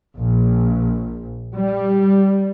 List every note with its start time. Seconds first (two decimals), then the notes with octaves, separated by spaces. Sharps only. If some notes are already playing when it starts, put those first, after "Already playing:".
0.16 A#1
1.56 G3